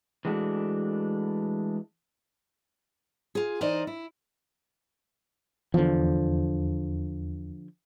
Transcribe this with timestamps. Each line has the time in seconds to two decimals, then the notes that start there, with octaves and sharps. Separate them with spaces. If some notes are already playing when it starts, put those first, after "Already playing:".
0.25 E3 G#3 A3 D4 F#4
3.35 F4 G#4
3.61 E3 D#4 A#4 C5 D5 D#5
3.87 E4
5.74 E2 D3 F3